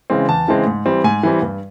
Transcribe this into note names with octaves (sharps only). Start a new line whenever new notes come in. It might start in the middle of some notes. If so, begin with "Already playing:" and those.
C#3 E3 G#3 C4
E2 A5
C#3 E3 G#3 C4
G#2
E3 G3 C4
G#2 G#5
E3 G3 C4
G2